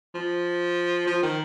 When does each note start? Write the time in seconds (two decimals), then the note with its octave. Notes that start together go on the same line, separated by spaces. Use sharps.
0.14 F3
1.07 F3
1.23 D#3